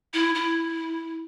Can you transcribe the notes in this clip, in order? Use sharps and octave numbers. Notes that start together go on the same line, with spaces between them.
E4
E4